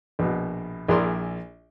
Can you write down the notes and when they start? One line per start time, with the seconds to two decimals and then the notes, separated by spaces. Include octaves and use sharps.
0.19 A#1 B2
0.88 A#1 E4 G#4 A#4 D5 C6